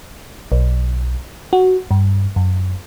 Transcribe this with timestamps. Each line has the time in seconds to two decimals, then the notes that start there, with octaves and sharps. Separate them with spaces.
0.52 B1
1.53 F#4
1.91 G2
2.36 F#2